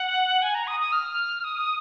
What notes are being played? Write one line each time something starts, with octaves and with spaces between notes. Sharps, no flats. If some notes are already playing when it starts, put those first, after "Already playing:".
Already playing: F#5
G#5
A#5
D#6
D#6
F6
D#6